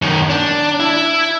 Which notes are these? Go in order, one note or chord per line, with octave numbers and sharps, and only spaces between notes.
F#2 D#3
D4
E4